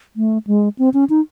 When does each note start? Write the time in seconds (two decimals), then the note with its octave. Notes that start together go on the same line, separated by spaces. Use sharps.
0.16 A3
0.47 G#3
0.79 C4
0.94 C#4
1.10 D#4